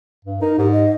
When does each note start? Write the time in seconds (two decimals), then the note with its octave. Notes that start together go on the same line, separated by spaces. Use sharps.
0.25 G2
0.41 D#4 A#4
0.58 G#2 G4
0.72 D#5